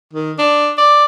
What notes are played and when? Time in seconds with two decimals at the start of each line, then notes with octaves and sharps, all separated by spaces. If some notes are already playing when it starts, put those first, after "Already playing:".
0.13 D#3
0.39 D4
0.78 D5